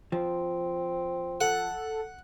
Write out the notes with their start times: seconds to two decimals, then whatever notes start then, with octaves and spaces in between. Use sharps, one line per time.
0.12 F3 C4
1.41 A4 F#5